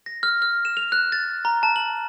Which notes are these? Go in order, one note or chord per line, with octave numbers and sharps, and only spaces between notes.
A#6
F6
F6
E7
F7
F#6
A6
A#5
A5
F#7